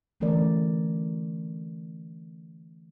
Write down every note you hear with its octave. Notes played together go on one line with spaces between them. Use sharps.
D3 E3 A3 C#4 A#4 D5